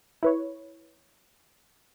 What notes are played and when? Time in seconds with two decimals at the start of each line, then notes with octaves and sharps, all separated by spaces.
0.23 E4 B4 C#5